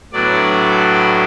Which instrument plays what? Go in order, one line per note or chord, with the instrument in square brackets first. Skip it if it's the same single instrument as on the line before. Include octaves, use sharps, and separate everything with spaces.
[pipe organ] A2 F#3 B3 D4 D5